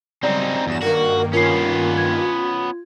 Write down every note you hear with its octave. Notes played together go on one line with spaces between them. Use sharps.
C#3 F#3 G3 C4 D#4 D5
E2 G2 F#3 E7
G2 D#3 A#3 F#4 A#4
B3 C#4 F4 A#4 C7
G#6